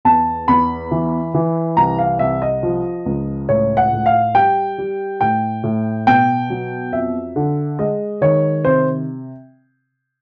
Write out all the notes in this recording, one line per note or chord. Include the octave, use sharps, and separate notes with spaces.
E2 A5
E2 B5
E3
E3
C2 A#5
F5
C2 E5
D#5
F3
C#2
A2 C#5
F#5
A2
F5
G3 G5
G3
A2 G5
A2
B2 G5
F#3
F2 E5
D3
G#3 D#5
D#3 C#5
C3 C5